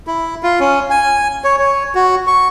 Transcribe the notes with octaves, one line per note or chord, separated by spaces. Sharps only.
E4
F4
C#4
G#5
C#5
C#5
F#4
C#6